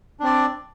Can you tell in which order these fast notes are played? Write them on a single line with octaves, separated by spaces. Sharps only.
D4 C4 D5